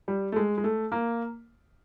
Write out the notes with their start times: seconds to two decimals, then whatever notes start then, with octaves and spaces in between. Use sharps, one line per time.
0.08 G3
0.32 A3
0.36 G#3
0.58 G#3
0.64 A3
0.92 A#3